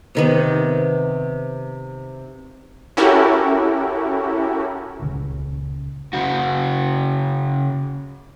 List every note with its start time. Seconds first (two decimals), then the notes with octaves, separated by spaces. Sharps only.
0.15 C3 D#3 B3
2.97 C#4 E4 F#4 G4 A4 A#4
4.99 D#1 C#2 C#3
6.13 C#3 F#4